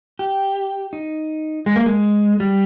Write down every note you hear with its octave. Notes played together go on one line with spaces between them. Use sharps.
G4
D#4
G#3
A#3
G#3
G3